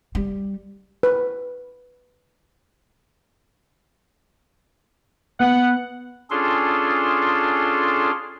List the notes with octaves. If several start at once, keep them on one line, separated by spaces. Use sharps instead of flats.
G3
B4
B3 F#5
C#4 D4 F4 G#4 A4 C6